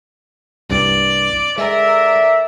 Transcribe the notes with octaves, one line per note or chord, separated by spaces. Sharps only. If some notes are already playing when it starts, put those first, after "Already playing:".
C2 G2 D5
D3 G#3 A#4 D5 E5